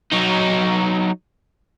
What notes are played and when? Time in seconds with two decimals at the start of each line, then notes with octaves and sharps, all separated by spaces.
0.12 F#3 D#4